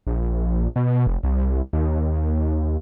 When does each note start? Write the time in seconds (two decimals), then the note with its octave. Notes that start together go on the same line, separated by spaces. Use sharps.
0.07 A#1
0.76 B2
1.07 F1
1.23 C2
1.73 D#2